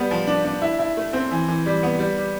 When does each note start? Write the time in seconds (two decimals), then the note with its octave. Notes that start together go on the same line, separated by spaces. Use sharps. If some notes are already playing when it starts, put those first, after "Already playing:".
Already playing: G3 B3
0.11 F3
0.27 D4
0.45 D4
0.62 E4
0.79 E4
0.97 A3
1.13 C4
1.31 E3
1.48 E3
1.66 G3
1.83 B3
1.99 G3
2.17 G3